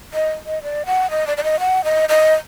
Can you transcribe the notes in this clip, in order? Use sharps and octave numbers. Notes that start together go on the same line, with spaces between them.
D#5
D#5
D5
F#5
D#5
D5
D5
D#5
F#5
D#5
D#5